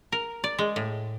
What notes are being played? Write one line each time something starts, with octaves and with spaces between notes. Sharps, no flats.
A#4
D5
G#3
A2